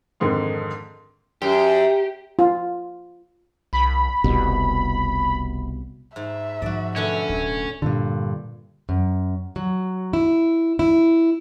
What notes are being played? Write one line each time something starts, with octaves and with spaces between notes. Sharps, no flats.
F2 G#2 D3 D#3
F#2 G4
F4
C2 B5
F1 C2 B2
G#2 E5
G#2 F3 F#4 D5
B2 D3 A3 C#4 E5
D1
G2 A#2 D3
F#2
F#3
E4
E4